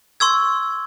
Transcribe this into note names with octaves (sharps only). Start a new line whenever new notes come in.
C6 C#6 E6 G#6